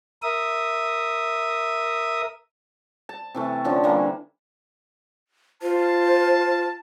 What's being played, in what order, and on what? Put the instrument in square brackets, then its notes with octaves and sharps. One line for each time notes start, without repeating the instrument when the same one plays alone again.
[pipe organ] A#4 E5 D#6
[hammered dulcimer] A5
C3 E3 A3
D3 F3 C#4 D4
D3 E3 G3 A#3
[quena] F4 [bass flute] C5 [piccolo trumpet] A5